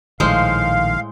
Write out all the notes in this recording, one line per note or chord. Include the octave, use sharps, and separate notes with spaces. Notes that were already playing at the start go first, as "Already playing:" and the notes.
A#1 A2 D#3 G#3 C5 F5